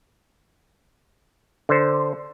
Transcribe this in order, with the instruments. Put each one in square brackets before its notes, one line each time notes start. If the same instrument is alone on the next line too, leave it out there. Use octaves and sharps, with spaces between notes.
[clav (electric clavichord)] D3 C5